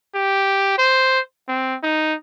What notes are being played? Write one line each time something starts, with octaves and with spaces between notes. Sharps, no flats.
G4
C5
C4
D#4